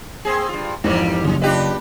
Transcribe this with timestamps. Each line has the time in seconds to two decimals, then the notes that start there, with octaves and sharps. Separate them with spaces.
0.25 A#3 C4 G#4
0.49 G2 F4
0.84 F2 G#2 E3 F3 G3 A#3
1.24 F#1 F#2
1.42 D4 F4 G4 B4 D#5